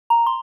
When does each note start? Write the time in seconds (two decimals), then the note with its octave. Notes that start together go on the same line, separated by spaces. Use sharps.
0.10 A#5
0.27 C6